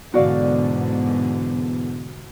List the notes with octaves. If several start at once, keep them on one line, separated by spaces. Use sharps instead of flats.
E2 G#2 B2 D3 F#4 D5 F5